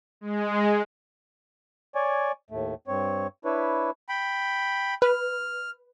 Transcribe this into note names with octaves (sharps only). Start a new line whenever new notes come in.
G#3
C#5 D5 G#5
D#2 A2 A3
G2 C4 C#5
D4 E4 B4 C#5
G5 B5
B4 F6